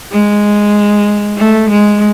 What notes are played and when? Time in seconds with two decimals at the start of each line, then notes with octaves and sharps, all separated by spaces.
0.12 G#3
1.38 A3
1.70 G#3